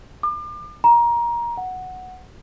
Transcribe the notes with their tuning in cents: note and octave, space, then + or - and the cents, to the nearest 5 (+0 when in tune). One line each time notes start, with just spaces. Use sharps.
D6 +35
A#5 +20
F#5 +0